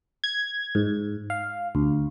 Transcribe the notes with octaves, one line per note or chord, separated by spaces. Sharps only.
G#6
G#2
F5
D2